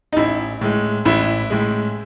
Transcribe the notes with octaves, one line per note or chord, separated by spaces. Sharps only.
D#4
A1 E4
A2 G#3
A1 E4
A2 G#3